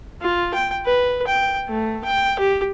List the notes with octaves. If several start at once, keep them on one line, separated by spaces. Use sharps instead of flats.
F4
G5
B4
G5
A3
G5
G4